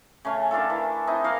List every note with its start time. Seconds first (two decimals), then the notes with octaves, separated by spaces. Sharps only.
0.25 C#3 A3 C#4
0.51 D#3 D4 F4 A4
0.70 E3
1.07 C4 D#4 E4 G#4
1.24 A#3 F#4 F5